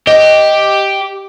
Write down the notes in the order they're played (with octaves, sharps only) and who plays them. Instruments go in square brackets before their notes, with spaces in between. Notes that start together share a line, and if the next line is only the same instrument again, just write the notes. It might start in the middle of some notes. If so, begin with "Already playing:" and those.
[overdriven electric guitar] G4 [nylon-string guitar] D#5